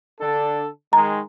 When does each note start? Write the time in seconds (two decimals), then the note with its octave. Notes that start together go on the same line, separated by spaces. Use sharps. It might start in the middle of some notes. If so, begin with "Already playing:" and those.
0.20 D3 D4 A4
0.93 D#3 G#3 A#5